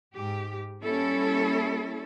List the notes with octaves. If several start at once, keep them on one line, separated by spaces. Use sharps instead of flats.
G#2 G4
G3 A#3 C#4 E4 A4